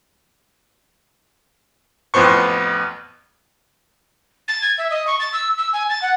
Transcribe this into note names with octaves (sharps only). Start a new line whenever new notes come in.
A1 F2 B3 C5 C#6
A6
G#6
E5
D#5
C#6
A6
E6
E6
G#5
A6
F#5